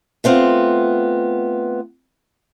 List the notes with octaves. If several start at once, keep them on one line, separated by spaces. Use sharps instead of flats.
A3 B3 C4 F4